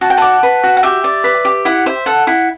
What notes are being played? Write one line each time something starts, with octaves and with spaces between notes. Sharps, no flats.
F#4 A5
G5
D5 F#5 A5
B4
F#4
F#5
G4 E5 G5
D5
B4
G4
E4 F#5
C5 E5
A4 F#5
E4 F#5